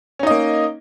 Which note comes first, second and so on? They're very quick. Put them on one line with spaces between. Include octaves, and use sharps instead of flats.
C#4 D#4 D#5 A#3